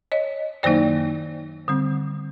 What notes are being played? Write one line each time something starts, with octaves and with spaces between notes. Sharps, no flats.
C#5 D#5
F#2 D#3 F#3 A#3 D#4 C5 D5
D3 G3 C4